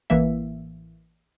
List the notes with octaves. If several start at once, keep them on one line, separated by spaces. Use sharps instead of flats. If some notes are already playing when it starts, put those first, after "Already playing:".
A1 E3 A#3 E5